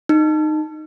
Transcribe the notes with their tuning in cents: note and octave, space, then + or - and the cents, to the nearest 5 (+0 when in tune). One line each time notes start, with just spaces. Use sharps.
D#4 -15